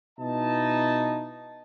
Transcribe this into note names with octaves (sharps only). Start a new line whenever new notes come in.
B2 D#4 E4 D#5 A5